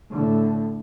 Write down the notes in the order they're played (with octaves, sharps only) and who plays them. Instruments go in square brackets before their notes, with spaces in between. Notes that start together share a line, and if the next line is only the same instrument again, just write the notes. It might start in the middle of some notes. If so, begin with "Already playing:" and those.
[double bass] A2 D3